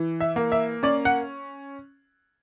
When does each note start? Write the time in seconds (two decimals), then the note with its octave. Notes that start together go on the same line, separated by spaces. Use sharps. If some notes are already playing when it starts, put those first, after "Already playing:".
Already playing: E3
0.20 E5
0.36 A#3
0.52 E5
0.83 C#4 D5
1.05 F#5